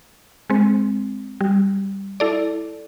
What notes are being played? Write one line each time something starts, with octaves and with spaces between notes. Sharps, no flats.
G#3 C4
G3
E4 A4 D5